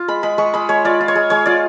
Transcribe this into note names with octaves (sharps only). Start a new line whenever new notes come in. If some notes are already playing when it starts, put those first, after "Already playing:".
Already playing: F4
G#3 B5
G#3 B5
G#3 C#6
G#3 B5
G#3 C#5
F4 D5
F4
C#5
G#3
G#3 C#5
F4 D5